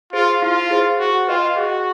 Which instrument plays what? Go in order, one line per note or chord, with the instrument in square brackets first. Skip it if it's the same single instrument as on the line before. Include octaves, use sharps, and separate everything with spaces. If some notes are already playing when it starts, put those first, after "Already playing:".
[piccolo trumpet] F4 [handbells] G#4 C5
[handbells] E4 [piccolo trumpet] F4
[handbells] G#4 C5
[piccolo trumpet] F#4 [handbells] G#4
[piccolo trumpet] F4 [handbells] B4 D#5 G5
[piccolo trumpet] F#4 [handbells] G#4